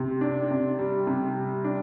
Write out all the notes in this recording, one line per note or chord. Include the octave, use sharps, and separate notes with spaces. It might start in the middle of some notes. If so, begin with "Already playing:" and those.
Already playing: C3
D4
C3
G3
C3
G3
D4